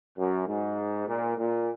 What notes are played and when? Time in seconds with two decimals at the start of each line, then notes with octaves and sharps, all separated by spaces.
0.18 F#2
0.47 G#2
1.07 A#2
1.38 A#2